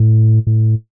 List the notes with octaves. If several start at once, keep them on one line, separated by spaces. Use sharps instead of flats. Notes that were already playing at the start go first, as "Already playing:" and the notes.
Already playing: A2
A2